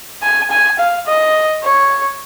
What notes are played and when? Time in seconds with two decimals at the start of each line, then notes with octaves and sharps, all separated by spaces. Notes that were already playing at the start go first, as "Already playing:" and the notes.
0.22 G#5
0.50 G#5
0.79 F5
1.07 D#5
1.63 C#5